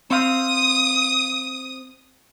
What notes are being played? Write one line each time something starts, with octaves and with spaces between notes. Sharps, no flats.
C4 F5 D#6